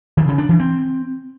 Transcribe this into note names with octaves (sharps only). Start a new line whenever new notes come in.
D#3
C#3
D4
E3
C4